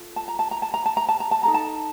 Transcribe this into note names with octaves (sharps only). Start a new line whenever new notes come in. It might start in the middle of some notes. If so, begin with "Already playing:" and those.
Already playing: F4 A4
A5
A#5
A5
A#5
A5
A#5
A5
A#5
A5
A#5
A5
D#4 A4 A#5
A5